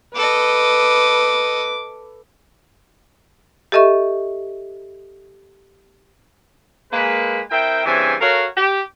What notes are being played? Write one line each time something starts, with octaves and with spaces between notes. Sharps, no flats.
A4 B4 D#5 D6
G4 A4 D#5 E5 C#6
G#3 A#3 B4
C4 E4 A#4 E5 G5
G2 C#3 E3 C4 E5 G#5
F#4 A4 A#4 C#5 F5
G4